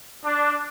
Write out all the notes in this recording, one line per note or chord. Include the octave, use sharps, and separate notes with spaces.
D4